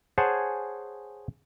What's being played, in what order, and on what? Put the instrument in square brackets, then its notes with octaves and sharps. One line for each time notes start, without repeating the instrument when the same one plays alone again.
[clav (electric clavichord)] G#4 C5 C#5 F#5 G#5 A5